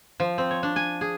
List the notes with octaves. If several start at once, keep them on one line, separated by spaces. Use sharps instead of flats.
F3
C4
C#5
D4
G#5
G#4